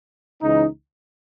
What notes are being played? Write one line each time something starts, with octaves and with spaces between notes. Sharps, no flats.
C#2 C#3 E3 D#4